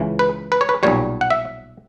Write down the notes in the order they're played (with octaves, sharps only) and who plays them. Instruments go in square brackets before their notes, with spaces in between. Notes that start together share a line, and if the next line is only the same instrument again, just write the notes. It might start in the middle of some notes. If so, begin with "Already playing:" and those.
Already playing: [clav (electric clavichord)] C#2 C#3 E3
B4
B4
C#5
B4
B1 A#2 G3 C#5
F#5
E5